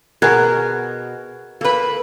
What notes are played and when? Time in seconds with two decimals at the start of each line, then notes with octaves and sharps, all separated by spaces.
0.22 B2 G#4 A#4 F#5 F#6 G#6
1.61 A#3 A4 B4 B5